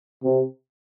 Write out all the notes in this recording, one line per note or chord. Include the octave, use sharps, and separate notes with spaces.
C3